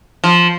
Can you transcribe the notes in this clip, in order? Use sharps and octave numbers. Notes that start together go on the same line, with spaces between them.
F3